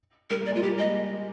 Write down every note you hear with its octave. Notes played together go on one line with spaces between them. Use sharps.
G3 A#4
A#3
D5
G#3
F4
G3 G4
A#3
G#3 D#5